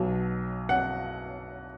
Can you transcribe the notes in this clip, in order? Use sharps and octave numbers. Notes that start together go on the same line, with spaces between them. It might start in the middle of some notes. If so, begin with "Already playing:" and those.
Already playing: B1 B2 F#3
F#5